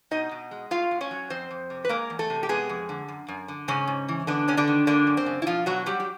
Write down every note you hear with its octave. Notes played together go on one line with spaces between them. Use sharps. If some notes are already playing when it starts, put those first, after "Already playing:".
B2 D#4 D#5
B2
G#3
A2 F4 F5
A2
C#4 C#5
F#3
F2 C4 C5
F2
C3
B4
G#3 A#3 A#4
E2
A3 A4
C3
G4
G#3 B3 G#4
F2
D3
F#2
F#2
D3
G#2 C#3 C#4
G#2
E3
D3 B3 D4
C3 C#4
D3 D4
D#3
D3 A#3 D4
F#2
C4
C#3
E4
B2 F3 F4
B2 F#3 F#4
F#3 G3 G4
G4